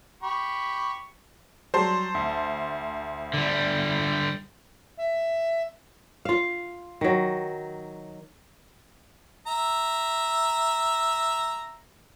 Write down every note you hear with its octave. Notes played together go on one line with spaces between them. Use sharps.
G4 B5 C#6
F#3 G3 C5 A5 C6
D2
D3 G3
E5
F4 F5
D#3 F#3
E5 A#5